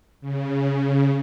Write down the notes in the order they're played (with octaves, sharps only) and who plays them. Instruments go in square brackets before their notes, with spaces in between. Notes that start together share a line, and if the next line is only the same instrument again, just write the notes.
[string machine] C#3